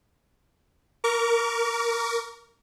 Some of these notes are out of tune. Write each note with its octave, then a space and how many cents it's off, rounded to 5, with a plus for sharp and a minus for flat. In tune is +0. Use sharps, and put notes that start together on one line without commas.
A#4 +0 D6 -45